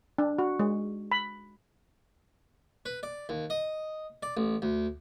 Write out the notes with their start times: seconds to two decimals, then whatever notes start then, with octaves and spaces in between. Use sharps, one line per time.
0.18 D4
0.39 F#4
0.59 G#3
1.12 B5
2.86 B4
3.03 D5
3.29 D#2
3.50 D#5
4.23 D5
4.37 A1
4.62 D2